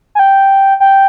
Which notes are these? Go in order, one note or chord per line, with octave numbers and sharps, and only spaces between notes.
G#5
G5
G5